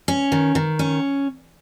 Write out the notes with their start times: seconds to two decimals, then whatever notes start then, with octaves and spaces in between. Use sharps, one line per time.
0.08 C#4
0.32 D#3
0.55 D#3
0.79 C#4